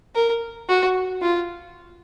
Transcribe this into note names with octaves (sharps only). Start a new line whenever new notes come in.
A#4
F#4
F4